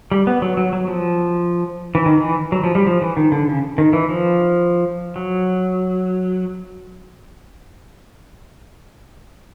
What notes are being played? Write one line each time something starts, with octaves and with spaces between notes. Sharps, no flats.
G3
B3
F#3
F#3
F#3
F3
E3
D#3
E3
F#3
F3
G3
F3
E3
D#3
D3
C#3
D#3
E3
F3
F#3